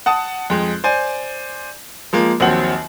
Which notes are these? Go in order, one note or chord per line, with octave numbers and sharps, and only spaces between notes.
F#5 A5 D#6
F2 G#3
C5 D5 G#5
F3 G#3 A#3
A#1 D#2 F#3 C4 F#5 F#7